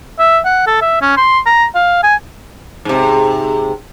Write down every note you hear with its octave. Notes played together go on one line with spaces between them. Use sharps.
E5
F#5
A4
E5
C#4
C6
A#5
F5
G#5
G#2 C3